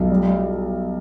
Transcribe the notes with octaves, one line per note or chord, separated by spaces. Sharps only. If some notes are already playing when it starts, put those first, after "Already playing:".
Already playing: B1
G3
G3